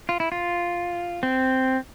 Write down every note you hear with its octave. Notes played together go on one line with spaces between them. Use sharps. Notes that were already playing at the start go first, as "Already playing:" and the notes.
F4
E4
F4
C4